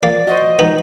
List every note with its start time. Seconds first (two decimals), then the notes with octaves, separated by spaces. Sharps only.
0.03 F3 A#3 D5
0.27 F#4 C5 D#5
0.59 F3 G#3 B3 D#4